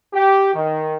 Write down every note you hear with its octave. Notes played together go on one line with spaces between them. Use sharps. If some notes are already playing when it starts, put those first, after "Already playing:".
G4
D#3